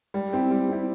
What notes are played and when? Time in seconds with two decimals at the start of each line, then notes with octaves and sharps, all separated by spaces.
0.14 G3
0.33 C4 E4 G4
0.51 G3
0.68 C4 E4 G4